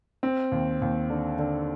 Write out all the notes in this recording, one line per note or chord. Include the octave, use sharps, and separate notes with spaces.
C4
D#2
D#2
D3
D3